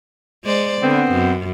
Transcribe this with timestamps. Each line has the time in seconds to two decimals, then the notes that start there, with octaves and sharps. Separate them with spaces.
0.45 G#3 C5 D5
0.82 D3 B3 C4
1.12 F#2